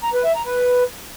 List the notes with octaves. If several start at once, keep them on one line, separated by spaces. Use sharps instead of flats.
A#5
B4
E5
A#5
B4